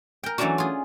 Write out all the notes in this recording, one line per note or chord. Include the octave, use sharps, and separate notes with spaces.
A#4 G5
E3 F#3 A3 C#4 D4 F#4
F4 G#4